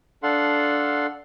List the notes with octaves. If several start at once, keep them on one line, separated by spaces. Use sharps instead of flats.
D4 A4 F5 F#5 C6